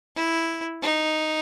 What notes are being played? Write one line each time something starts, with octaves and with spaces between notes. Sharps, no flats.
E4
D#4